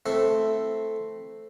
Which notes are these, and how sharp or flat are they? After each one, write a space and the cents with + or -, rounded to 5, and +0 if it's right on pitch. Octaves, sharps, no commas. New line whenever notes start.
A3 +0 C4 +0 E4 +0